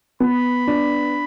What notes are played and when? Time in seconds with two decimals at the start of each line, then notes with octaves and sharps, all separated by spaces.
0.20 B3 B5
0.67 D4